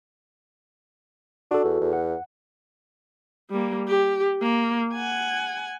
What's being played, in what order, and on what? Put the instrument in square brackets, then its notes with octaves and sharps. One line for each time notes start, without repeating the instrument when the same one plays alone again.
[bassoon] D4 [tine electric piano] F#4 A4
[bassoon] E2
E2
[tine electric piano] F#5
[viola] G3 A#3
G4
A#3
F#5 G#5